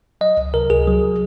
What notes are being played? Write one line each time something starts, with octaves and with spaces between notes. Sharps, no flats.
F#3 D#5
C#2
C3 A#4
C#2 G#4
F#3